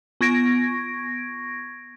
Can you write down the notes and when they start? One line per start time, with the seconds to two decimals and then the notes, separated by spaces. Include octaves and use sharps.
0.21 B3 C#6 G#6 A#6 D7